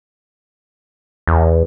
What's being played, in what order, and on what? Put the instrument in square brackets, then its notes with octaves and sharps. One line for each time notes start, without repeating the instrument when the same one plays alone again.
[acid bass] E2